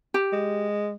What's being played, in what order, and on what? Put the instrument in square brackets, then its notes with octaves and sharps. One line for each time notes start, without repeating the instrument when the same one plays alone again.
[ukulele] G4
[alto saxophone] G#3